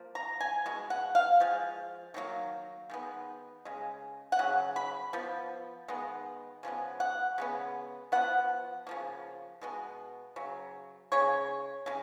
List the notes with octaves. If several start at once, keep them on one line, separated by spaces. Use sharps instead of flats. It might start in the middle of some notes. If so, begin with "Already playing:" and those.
Already playing: F3 A#3
A#5
G#5
B2 G#3
F#5
F5
F3 G#3
D#3 F#3 A#3
D#3 G#3 B3
C#3 G#3
F#5
C#3 F#3
B5
F3 B3
D#3 G#3 B3
C#3 F3 G#3 B3
F#5
C#3 G#3 B3
F3 B3 F#5
C#3 F3 A#3
B2 G#3 B3
C#3 F#3
C#3 G#3 C#5
C#3 G#3